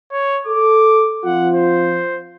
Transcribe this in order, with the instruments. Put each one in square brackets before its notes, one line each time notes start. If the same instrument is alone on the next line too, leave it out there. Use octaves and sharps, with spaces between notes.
[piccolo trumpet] C#5
[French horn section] A4 [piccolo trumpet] D6
[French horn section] F3 C4 F4 [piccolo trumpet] F#5
[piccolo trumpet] C5